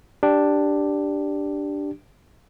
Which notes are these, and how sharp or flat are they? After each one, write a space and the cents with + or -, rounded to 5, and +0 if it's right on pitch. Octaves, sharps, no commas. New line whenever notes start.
D4 +0 G4 +0